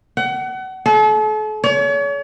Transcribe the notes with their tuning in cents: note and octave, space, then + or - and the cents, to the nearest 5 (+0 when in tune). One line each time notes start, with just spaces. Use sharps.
F#5 +30
A4 -40
C#5 +40